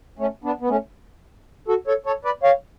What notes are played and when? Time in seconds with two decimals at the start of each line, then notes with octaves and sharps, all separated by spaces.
0.19 A3 C#4
0.44 B3 D4
0.61 B3
0.69 A3 C#4
1.68 F#4 A4
1.87 A4 C#5
2.06 A4 C#5
2.25 B4 D5
2.43 C#5 F5